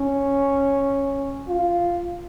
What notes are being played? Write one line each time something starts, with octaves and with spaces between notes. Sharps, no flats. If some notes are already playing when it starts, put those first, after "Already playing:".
Already playing: C#4
F4